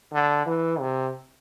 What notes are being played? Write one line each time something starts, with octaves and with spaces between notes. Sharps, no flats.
D3
E3
C3